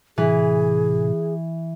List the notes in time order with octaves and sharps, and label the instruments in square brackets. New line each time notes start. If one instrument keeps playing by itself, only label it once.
[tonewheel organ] A2 C3 [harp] E3 [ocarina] G#4